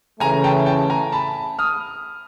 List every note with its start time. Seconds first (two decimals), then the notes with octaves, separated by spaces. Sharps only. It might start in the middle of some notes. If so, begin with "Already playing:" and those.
0.20 C#3 E3 A3 G#5 A#5
0.44 G5 A5
0.66 G5 A5
0.90 G#5 A#5
1.12 A5 B5
1.59 D#6 F6